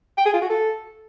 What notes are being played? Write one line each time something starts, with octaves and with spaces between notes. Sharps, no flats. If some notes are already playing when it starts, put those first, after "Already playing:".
G5
G#4
F4
F#4
A4